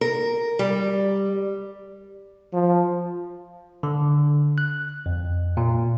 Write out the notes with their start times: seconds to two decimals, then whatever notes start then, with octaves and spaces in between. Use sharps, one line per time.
0.01 A#4
0.59 G3
2.53 F3
3.83 D3
4.58 F#6
5.06 F2
5.57 A#2